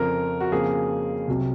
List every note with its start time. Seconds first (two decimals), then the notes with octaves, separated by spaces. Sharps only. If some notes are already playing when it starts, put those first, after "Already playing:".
Already playing: F2 C#3 F3 A#4
0.40 F#4
0.52 F2 C#3 F3 A#3 G#4
1.28 C2 C3 F#3